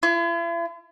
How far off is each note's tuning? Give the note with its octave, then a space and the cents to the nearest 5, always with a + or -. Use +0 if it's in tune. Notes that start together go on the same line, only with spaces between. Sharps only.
E4 +45